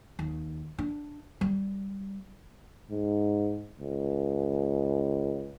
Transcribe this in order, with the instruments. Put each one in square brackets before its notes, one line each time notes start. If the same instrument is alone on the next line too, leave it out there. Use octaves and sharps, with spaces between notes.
[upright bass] D#2
D4
G3
[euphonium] G#2
C#2